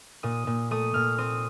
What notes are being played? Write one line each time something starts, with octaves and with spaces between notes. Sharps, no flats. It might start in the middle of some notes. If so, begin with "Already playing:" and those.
A#2 D#6
A#2
A3 D#6
A#2 F6
C4 D#6